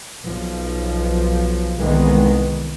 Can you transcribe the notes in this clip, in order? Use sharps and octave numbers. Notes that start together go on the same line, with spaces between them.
B1 F3
C2 D#3 E3 G#3 B3